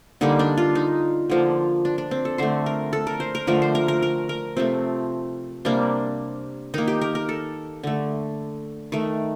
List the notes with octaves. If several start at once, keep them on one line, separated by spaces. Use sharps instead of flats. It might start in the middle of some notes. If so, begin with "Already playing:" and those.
D3 G3 A#3 D#4
D4
F4
D#4
D3 F3 A#3
D4
D4
C4
A4
D3 A3 C5
A#4
A4
A#4
C5
A#4
D3 F3 A3 A#4
C5
A#4
A#4
A#4
A#4
C3 F3 A3 C4
C3 G3 A#3 D4
D#3 A#3 D#4
G4
A#4
A#4
A4
D3 A3
D#3 A3